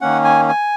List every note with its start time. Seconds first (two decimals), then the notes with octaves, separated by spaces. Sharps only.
0.01 D#3 A#3 C#4 F#5
0.24 G#5
0.48 G#5